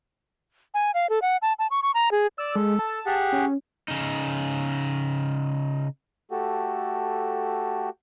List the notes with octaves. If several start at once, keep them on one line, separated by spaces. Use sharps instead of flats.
G#5
F5
A4
F#5
A5
A5
C#6
C#6
A#5
G#4
D5 E6
G#3 A4
A5
G4 G#4 F#5
C#4
C#3 D#4
A3 F#4 G4 A4